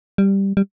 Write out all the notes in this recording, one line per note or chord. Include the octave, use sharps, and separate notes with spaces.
G3
G3